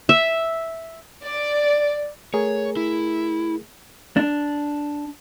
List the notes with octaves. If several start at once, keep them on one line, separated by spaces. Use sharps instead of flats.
E5
D5
A3 G#4 A#4 C#5
E4
D4